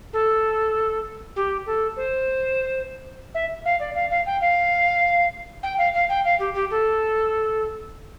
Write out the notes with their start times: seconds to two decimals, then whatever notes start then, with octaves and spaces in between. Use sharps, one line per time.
0.13 A4
1.36 G4
1.66 A4
1.96 C5
3.34 E5
3.65 F5
3.80 D5
3.95 F5
4.10 F5
4.26 G5
4.41 F5
5.63 G5
5.78 F5
5.94 F5
6.09 G5
6.24 F5
6.39 G4
6.54 G4
6.70 A4